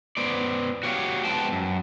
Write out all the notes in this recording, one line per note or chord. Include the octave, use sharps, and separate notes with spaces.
B3 C5 D5
F#4 G4 C#5 D5 F5
G#3 B3 C5 G5 A5
F#2